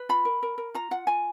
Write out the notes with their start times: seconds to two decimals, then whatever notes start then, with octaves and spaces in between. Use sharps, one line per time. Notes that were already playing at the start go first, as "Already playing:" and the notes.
Already playing: B4
0.09 F4 B5
0.25 A#4
0.43 A#4
0.58 A#4
0.74 F4 A#5
0.91 F4 F#5
1.07 F4 G#5